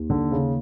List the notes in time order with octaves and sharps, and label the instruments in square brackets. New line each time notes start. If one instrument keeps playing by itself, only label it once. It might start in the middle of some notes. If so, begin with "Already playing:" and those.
Already playing: [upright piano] D#2
[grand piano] D3
C#3